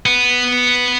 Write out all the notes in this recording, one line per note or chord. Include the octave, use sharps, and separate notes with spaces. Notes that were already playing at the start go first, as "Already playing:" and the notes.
B3